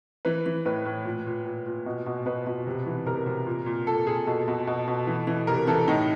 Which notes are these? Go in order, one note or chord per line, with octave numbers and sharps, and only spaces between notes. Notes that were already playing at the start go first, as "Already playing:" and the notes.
E3 B4
E3
A2 B4
A2
A#2
A#2
A#2
A#2
B2
B2
B2 B4
B2
C3
E3
C3 A#4
C3
A#2
A#2
A#2 A4
A#2 G#4
B2 A4
B2
B2
B2
E3
E3
C3 A#4
E3 A4
A2 D#4